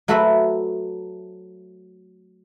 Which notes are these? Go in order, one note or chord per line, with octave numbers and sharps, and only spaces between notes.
F#3 A3 F#4 B4 C5 E5